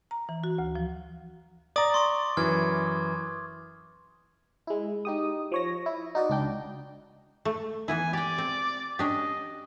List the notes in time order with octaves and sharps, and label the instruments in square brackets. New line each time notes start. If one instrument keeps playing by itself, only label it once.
[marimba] A#5
E3
F#4
D2
F3
[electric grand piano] D5 A#5 [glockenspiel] D6 D#6 A6
[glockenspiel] C6 C#6 D#6
[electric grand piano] F#2 E3 [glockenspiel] F6 G#6
[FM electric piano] G#3 E4
D#4 G4 D#6
F3 C#5 A#6
E4
D#4 F#4 D5 D#5
C#2 D4 G5 G6
[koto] A3
[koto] E3 B3 E4 [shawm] G#5
[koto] G4 G5 [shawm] D5
[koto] C4
[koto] C#4 D4 G4 [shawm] D#5